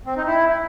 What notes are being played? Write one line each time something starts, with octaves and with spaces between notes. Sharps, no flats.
C4
D#4
E4